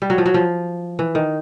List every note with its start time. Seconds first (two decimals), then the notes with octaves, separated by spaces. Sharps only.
0.02 G3
0.10 F#3
0.18 F3
0.26 F#3
0.34 F3
0.99 E3
1.15 D#3